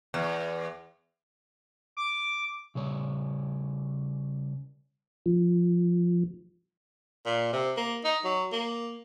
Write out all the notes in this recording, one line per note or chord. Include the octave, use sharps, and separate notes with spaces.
E2
D6
C#3 G3 C#5
F3
A#2
C3
A#3
D#4
F#3
A#3